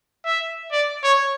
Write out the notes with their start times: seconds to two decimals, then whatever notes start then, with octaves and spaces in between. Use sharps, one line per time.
0.25 E5
0.72 D5
1.04 C#5